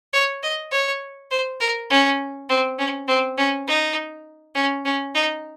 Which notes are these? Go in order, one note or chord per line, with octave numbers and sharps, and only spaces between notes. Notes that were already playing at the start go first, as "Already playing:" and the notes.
C#5
D#5
C#5
C5
A#4
C#4
C4
C#4
C4
C#4
D#4
C#4
C#4
D#4